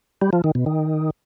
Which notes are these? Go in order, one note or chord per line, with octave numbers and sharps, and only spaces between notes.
G3
F3
D#3
B2
D#3